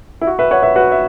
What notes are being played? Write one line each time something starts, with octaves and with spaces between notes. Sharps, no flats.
E4
F#4
B4 E5
C#5 F#5
B4 E5
F#4 B4
E5